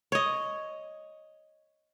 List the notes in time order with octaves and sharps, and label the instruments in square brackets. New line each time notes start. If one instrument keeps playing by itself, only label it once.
[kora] C#5 D#5